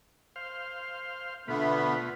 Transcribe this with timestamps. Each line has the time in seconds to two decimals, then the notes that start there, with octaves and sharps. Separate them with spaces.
0.36 C5 F5
1.48 B2 D3 A3 B3 F4 B4